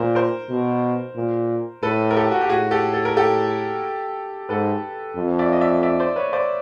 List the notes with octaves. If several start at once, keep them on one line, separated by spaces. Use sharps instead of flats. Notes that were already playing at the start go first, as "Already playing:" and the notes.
Already playing: A#2 A#4 C5
A#4 C5
B2
A#2
A2 A4 B4
A#4
G4 A4
F#4
G4
A2 F#4 G#4
G4 A4
A4
A#4
G4 A4
G#2 A4 B4
F2
D5 E5
D#5
D5 E5
D5 E5
C5 D5
B4 C#5
C5 D5